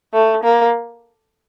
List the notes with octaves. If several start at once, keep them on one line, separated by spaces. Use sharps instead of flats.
A3
A#3